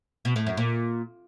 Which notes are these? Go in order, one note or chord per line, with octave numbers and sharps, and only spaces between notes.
B2
A2
F#2
A#2